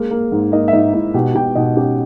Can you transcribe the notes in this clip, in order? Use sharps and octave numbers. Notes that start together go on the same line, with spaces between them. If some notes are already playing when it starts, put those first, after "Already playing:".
Already playing: G#3 A#3
A#3
G#2
A#3 D#4 D#5
E5
G#2 D#4 D#5
G#2 E4 E5
B2 G4 G5
B2 G4 G5
B2 D#4 D#5
C#4 G4 G5